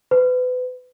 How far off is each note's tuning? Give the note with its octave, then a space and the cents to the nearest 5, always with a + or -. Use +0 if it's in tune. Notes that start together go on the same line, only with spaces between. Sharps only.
B4 +30